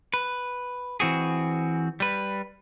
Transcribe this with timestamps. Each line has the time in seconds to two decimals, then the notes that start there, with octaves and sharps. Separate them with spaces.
0.14 B4
1.00 E3 C4 F#4 G#4
2.00 G3 B4